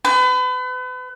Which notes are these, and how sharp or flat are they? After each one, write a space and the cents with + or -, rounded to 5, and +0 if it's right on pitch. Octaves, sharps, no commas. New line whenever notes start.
B4 +35